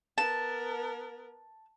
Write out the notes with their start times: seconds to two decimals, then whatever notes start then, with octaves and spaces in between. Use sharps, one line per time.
0.18 B3 A#4 A5